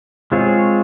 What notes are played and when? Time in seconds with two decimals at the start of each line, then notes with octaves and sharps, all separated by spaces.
0.32 G#3 C4 F4 G#4 C#5